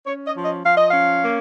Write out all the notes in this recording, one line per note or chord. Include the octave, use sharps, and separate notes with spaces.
C#4 C#5
D#5
F3
D#5
F3 F5
D#5
C#4 F5
A#3